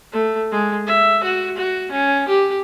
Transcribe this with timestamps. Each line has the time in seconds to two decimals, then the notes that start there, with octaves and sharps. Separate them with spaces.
0.13 A3
0.52 G#3
0.87 E5
1.24 F#4
1.57 F#4
1.92 C#4
2.28 G4